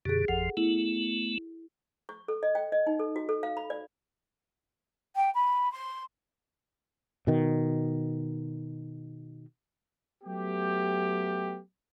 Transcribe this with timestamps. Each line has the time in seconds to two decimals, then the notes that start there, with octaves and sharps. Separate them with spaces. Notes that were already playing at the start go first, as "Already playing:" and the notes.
0.05 F#2 B2 D3 G4 G#4
0.28 G#1 F2 F3 A4 F#5
0.57 A3 B3 E4
2.09 C#6
2.28 A4
2.43 D#5
2.55 G5
2.72 D#5
2.87 D#4
2.99 A4
3.16 F#4
3.29 A4
3.43 F5
3.57 B5
3.70 D5
5.15 G5
5.34 B5
5.72 C6
7.27 B2 D#3
10.24 F#3 A3 B3 G4